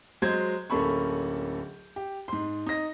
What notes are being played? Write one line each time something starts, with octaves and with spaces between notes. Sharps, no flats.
F#3 G#3 C5 G6 G#6
D1 A#3 C#4 A4 B5 C#6
G4
G#2 C6
D#4 A#6